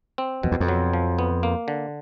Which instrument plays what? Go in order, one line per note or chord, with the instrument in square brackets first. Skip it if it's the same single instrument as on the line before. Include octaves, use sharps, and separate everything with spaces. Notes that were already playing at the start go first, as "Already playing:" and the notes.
[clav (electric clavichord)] C4
[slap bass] F2 [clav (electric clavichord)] B2
[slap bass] E2
F2
[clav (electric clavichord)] F#3
F3
B3
A#3
D3